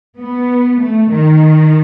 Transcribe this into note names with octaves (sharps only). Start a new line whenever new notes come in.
B3
A3
D#3